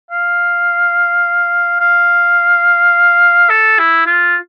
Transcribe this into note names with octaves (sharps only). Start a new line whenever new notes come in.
F5
F5
A4
E4
F4